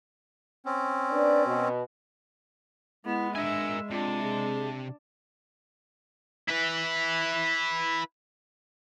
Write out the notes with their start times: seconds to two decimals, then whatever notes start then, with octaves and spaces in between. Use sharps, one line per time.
0.66 C4 C#4
1.11 D4 B4 D5
1.46 B2
3.05 G#3 B3 E4
3.35 D4 A#4 E5 G#5
3.90 C3 D4 F4
4.23 G#4
6.49 E4 B4